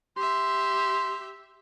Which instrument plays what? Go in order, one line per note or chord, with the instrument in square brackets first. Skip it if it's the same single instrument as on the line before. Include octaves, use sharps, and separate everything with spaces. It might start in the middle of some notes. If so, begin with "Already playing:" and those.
[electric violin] G4 E5 [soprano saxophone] C6